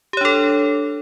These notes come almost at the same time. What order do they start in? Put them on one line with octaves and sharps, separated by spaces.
G4 C#5 D4 A4